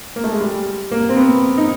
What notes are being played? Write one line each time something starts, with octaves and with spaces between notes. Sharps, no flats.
A#3
A3
G#3
G3
A#3
C4
B3
D#4